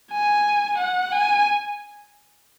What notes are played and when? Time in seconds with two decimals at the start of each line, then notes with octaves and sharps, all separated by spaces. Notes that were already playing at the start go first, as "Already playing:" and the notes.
0.12 G#5
0.78 F#5
1.12 G#5